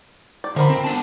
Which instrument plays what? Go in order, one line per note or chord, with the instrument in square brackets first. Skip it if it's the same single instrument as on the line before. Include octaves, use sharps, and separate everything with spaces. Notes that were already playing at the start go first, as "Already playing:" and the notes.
[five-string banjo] D5
[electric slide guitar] D3 [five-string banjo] F3 A#4 B5
[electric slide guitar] C4
B3 D4 A5